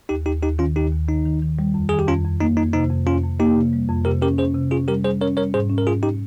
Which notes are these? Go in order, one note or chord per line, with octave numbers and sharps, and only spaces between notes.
D#2 D#4 G4
D#2 D#4 G4
D#2 D#4 G4
D#3 C#4 F4
D#2 D#4 G4
D#2
D#3 D#4
D#3
D#3
G3
F2
D#3 G#4
G4
F2 C#4 F4
F2
A#3 D#4
F2 D#4
C3 D#4
F2
F2 C#4 F4
F2
A#3 D#4 G4
C3
G3
F2
C3 G4 A#4
C#4 G4 A#4
C#4 G#4 C5
C3
C#4 F4 G#4
G3 G4 A#4
G3 G#4 C5
C#4 A#4 C#5
G3 A#4 C#5
G#2 G#4 C5
C#4
A#4
G#2 F4 G#4
D#4 G4